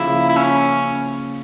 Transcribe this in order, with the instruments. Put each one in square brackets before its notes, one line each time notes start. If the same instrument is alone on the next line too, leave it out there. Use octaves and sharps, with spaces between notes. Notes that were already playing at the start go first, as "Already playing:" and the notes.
Already playing: [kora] C#3 F3 A#3 [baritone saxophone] E4
[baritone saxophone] E4
C#4